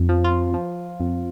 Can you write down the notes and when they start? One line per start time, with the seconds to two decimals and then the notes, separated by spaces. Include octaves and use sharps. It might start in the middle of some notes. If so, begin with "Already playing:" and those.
Already playing: F2
0.09 F3
0.24 F4
0.54 F3
1.00 F2